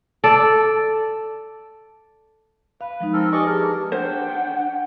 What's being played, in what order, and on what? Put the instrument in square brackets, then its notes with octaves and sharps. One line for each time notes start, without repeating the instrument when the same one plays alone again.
[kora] A4 D5
[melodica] B4 [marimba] F5
[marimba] F3 G#3 D#4
[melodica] C4 A4 A#4
[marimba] G4 B4 G#5 [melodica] D5 D#5 C#6
[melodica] D4 A#4 [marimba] G#4
[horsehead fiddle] D4 G5 [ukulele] C5 [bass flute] F#5